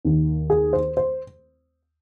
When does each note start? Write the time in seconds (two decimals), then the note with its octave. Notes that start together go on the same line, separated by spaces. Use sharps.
0.05 D#2 D#3
0.50 G#4
0.73 C5
0.97 C5